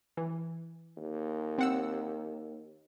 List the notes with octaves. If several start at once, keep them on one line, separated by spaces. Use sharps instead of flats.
E3
D#2
C4 F#5 E6